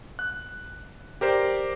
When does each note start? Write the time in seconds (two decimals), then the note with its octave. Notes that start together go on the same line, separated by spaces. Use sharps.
0.19 F#6
1.21 G4 A#4 C5 D5